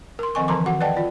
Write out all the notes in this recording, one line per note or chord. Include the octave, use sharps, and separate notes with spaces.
A#4 C6
D#3 F3 C4 D#5 G#5 C#6
D3 E3 F3 A#4 C6 D6
D#3 F#4 F#5 D6
B4 D5 D#5 F#5 G5 A5
F4 D5